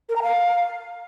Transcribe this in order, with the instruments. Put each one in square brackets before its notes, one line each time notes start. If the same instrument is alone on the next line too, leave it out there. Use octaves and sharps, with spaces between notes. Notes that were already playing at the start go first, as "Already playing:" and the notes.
[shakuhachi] A#4
A#5
F5